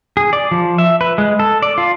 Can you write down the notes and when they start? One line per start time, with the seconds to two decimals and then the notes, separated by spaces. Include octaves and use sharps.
0.17 G#4
0.33 D5
0.51 F3
0.78 E5
1.01 B4
1.18 G#3
1.40 A4
1.62 D5
1.78 F4